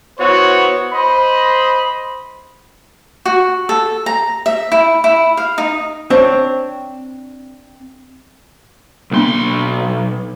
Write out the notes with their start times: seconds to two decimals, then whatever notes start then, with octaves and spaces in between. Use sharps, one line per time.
0.19 B3 E4 F#4 C5 C#5
0.93 C5 D#5 B5
3.26 F#4
3.69 A4
4.06 A#5
4.46 E5
4.72 E4
5.04 E4
5.37 F5
5.58 D#4
6.10 C4 D4 C#5
9.12 B1 A#3 B3 D4 C6